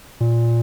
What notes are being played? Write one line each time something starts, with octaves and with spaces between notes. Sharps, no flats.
A#2